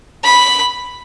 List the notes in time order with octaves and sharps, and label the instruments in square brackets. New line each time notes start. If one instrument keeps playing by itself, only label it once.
[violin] B5